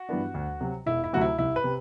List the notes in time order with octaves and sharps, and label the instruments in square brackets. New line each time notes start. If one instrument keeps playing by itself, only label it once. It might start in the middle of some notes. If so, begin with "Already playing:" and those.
Already playing: [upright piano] F#4
[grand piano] G2 E3 B3 D4
D2
C3 F#3
[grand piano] E1 [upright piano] E4
[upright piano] E4
[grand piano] D2 C3 F#3 A3 [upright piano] F#4
[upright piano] E4
[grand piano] C2 [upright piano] E4
[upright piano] B4
[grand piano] C3